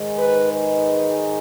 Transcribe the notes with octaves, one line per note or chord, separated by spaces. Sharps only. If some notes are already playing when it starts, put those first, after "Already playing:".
Already playing: G#2 D#3 G#3 D#4
B4
B4